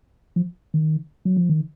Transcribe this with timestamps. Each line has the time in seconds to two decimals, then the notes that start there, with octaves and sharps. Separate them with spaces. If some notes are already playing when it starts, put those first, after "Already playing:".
0.36 F3
0.74 D#3
1.25 F#3
1.37 F3
1.49 D#3